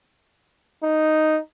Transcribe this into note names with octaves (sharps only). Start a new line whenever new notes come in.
D#4